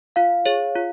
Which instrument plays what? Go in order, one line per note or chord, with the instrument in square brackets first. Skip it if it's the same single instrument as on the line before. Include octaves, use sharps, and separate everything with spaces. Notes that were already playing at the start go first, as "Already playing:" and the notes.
[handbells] F4 [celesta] F5
[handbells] G#4 C#5
F4